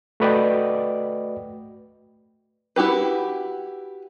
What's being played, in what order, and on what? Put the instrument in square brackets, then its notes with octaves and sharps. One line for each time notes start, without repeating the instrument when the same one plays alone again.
[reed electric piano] A3 F#4 B4 D5 D#5 G5
[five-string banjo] E4 F#4 G4 B4